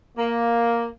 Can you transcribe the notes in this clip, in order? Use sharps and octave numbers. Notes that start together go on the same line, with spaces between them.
A#3